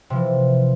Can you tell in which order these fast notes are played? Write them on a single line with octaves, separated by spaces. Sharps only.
C3 F3 E3